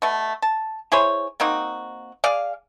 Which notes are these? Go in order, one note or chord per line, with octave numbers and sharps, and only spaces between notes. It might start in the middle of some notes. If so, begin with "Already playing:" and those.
B2 A3
A5
E4 G#4 C5 C#5
A#3 C4 D#4 F#4
G#4 D5 F5